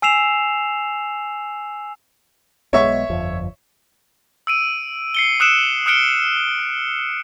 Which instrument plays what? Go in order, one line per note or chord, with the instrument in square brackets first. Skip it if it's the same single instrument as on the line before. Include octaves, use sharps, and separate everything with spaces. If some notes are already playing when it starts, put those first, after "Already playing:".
[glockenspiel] G#5 E6 C7 E7 F7
[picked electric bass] B1 G#3 B3 [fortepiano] C#5 E5 C#6
[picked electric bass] G1 F2 F3
[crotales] E6 D7 D#7
C7 C#7 G7
D#6 E6 F#6 C#7 D7 E7
D#6 F6 F#6 C#7 D7 G7